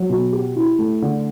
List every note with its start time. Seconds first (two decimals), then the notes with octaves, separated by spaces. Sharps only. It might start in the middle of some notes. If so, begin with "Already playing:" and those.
Already playing: F#3
0.10 B2
0.32 G4
0.56 E4
0.79 A3
1.02 D3